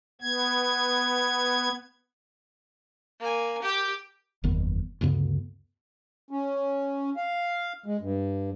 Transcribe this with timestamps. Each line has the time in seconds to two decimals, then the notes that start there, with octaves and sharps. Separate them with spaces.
0.21 B3 G#6
3.20 A#3 G#5
3.62 G4 G5
4.44 F#1 E2 D#3 B3
5.01 D2 G2 C#3 B3
6.31 C#4
7.17 F5
7.86 G#3
8.01 G2